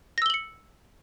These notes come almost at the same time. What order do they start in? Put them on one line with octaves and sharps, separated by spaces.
A#6 E6 G7 F#7 C#7